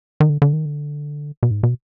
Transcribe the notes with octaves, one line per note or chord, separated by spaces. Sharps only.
D#3
D3
D3
D#3
D3
B2
G#2
B2